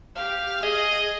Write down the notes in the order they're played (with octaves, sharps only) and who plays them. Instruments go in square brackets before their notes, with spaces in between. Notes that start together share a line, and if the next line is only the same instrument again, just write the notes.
[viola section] G4 [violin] F5
[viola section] G#4 [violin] D#5